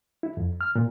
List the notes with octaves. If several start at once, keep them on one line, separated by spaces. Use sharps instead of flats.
E4
F2
F6
A#2